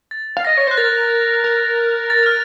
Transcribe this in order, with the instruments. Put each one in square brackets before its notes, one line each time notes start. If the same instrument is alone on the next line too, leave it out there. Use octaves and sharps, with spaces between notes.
[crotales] A6
[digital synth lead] F5
[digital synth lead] D#5 [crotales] A#6
[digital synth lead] C#5
[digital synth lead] C5 [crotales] F#6
[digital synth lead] A#4 [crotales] A6
[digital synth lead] A#4
[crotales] A6
F6